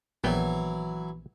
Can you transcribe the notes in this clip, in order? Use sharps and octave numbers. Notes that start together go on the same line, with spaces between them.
A#1 E3 F#3 B3 G5